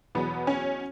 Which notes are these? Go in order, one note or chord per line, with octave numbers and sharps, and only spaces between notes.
E2 B2 F#3 B3
C#4